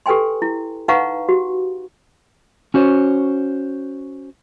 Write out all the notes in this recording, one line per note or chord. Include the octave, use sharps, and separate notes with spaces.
G4 A4 B4 G5 G#5 C6
E4
D#4 B4 F5 F#5 A#5 C#6
F#4 G4
C#4 F#4 C5 C#5